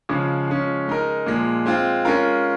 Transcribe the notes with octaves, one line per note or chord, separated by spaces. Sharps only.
C#3 F3 G#3
F3 G#3 C#4
G#3 D#4 A#4
A#2 F3 G#3
G#3 C4 F4
G#3 C#4 F4 A#4